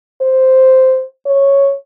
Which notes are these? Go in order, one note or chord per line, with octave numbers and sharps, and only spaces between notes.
C5
C#5